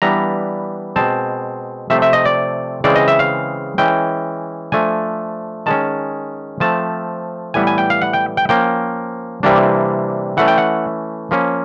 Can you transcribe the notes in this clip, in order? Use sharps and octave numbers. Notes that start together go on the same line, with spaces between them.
E3 G3 B3 D4 A#5
B2 G#3 C4 A5
C3 F3 A3 C4 E5
E5
D#5
D5
C#3 E3 G#3 C4 D5
D#5
E5
F5
E3 G#3 C#4 G5
F3 A3 D4 G#5
D#3 G#3 C#4 A5
F3 A3 C4 A5
A2 E3 G3 B3 G#5
G#5
G5
F5
F#5
G5
G5
F3 A#3 C#4 G5
C3 E3 G3 A#3 D4
E3 A3 C#4 F#5
G5
F#5
F3 A#3 C#4